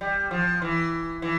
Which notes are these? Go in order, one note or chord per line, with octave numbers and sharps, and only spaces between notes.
G3
F3
E3
E3